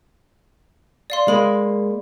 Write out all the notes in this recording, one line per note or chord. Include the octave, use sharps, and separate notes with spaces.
D5 F5 C6
G#3 A#3 D#5 B5